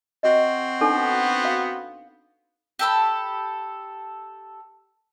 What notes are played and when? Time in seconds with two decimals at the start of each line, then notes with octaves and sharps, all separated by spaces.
0.23 C4 F#4 D#5 C#6
0.81 B3 D4 D#4 A4
1.45 F5
2.79 G4 A4 B5